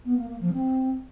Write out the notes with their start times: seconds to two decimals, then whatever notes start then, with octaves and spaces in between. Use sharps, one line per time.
0.05 B3
0.17 A#3
0.29 A#3
0.41 F3
0.53 C4